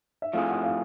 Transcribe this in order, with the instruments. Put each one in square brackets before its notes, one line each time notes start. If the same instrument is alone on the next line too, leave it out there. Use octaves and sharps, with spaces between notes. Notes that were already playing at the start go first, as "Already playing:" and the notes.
[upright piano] E5
[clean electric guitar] F3 A3 C4 E4 G#4 [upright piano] F5
[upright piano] F#5
F5